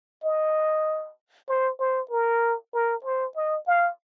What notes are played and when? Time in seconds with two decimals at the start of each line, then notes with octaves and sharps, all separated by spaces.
0.23 D#5
1.48 C5
1.79 C5
2.11 A#4
2.74 A#4
3.04 C5
3.36 D#5
3.67 F5